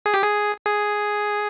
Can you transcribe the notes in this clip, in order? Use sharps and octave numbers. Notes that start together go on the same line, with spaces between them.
G#4
G4
G#4
G#4